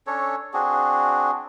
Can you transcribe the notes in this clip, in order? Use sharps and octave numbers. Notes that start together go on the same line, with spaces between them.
C#4 D4 A4 C#5
C4 D4 F#4 G#4